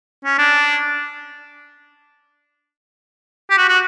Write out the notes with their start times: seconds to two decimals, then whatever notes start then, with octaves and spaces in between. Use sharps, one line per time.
0.25 C#4
0.38 D4
3.50 G4
3.57 F#4
3.68 F#4